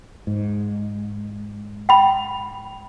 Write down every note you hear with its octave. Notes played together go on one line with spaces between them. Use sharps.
G#2
G5 B5